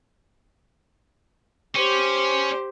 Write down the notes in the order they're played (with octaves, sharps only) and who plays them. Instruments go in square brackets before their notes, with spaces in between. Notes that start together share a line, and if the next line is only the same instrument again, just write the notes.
[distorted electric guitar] C#4 [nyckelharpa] G4 C5